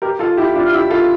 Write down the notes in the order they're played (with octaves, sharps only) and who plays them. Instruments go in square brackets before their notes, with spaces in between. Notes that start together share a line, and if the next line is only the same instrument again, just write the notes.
[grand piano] G4 A#4
F4 A4
E4 G4
D4 F4
[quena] F6
[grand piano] E4 G4 [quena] E6
[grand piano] F4 A4